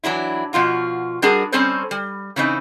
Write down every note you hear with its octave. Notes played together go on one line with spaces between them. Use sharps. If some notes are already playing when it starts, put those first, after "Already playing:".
E3 F#3 D4 E4
B2 F3 F4 F#4
G3 D4 F#4 G#4 A#4
G3 C4 C#4 A4 C5 C#5
G3
C#3 E3 C4 D#4